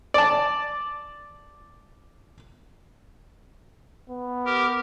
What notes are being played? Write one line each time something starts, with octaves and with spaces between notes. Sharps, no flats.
D5 A5
B3
G4 A#4